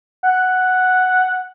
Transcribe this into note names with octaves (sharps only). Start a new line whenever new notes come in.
F#5